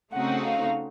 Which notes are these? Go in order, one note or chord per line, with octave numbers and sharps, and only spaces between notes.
C#3 A3 C4 D#4 F#4 F#5
F5